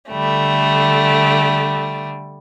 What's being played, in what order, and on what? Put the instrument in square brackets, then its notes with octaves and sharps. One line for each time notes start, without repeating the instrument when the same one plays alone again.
[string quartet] D3 G3 A3